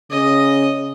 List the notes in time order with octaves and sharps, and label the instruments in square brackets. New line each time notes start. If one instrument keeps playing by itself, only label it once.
[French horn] C#3 [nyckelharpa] D#5